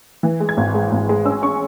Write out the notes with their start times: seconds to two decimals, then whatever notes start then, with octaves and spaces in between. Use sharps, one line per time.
0.23 E3
0.40 G#3
0.49 G#6
0.57 G#1
0.74 G#3
0.92 G#1
1.09 G#3
1.25 C#4 E6
1.42 C#4 C#6